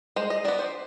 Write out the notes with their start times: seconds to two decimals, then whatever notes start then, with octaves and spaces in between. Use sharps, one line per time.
0.16 G#3 C5
0.30 D#5
0.45 B3 D4 D5
0.59 C5